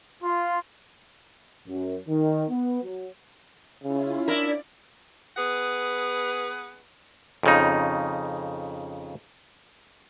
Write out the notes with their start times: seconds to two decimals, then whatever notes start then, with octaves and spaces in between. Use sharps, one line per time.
0.22 F4
1.68 F#2
2.08 D#3
2.50 B3
2.83 F#3
3.83 C#3 C#4 E4 F4
4.28 D4 E4 A#4 D5
5.37 B3 G#4 B4 F#5
7.43 F2 C#3 D#4